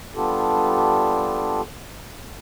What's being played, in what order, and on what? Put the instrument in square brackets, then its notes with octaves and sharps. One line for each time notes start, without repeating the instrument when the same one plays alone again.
[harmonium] G3 B3 D4 F4 G4 A4